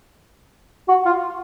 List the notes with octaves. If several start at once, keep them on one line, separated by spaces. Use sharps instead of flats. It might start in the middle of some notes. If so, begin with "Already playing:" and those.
F#4
F4